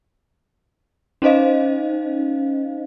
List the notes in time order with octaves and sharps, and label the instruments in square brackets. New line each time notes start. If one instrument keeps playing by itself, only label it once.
[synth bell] C#4 D#4 C5 D#5 F5